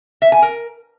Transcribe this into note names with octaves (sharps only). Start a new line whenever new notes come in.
E5
G#5
A#4